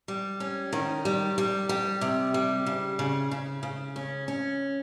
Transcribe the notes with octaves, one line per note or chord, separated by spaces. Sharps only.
G3
C#4
D#3
G3
G3
G3
C3
G3
C#3
C#3
C#3
C#3
C#4
C#4